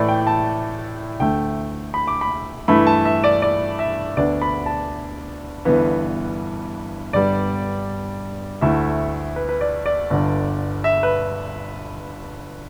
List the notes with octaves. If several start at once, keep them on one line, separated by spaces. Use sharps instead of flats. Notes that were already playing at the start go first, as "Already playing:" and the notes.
Already playing: A2 E3 A3 E4 D5
G5
A5
D2 D3 A3 G5
B5
D6
B5
G2 E3 A3 E4 B5
A5
E5
D5
D5
E5
D2 D3 B3 D4 D5
B5
A5
G1 G2 E3 B3
G1 G2 G3 B3 D5
D2 D3 A3 E4 E5
B4
B4
D5
D5
G1 G2 D3
E5
B4